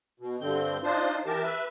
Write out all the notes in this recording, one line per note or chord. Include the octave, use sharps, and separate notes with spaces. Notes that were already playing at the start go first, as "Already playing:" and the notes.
B2
G2 D3 C4 G6
D4 D#4 F4 C5
E3 G4 A#4 A5
B4 E5